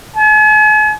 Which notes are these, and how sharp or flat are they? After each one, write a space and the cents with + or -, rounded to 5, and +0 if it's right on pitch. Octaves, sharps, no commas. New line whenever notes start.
G#5 +45